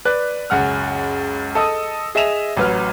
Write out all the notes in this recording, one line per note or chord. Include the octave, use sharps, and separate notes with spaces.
B4 D5 F#6
C#2 F#2 F#5 F6
A4 D#5 D#6
G#4 D#5 E5 E7 F7
A1 F#3 B4 F6